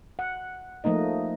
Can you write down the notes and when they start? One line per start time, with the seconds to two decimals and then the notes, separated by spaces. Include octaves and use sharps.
0.19 F#5
0.84 F3 A3 A#3 D#4 D#5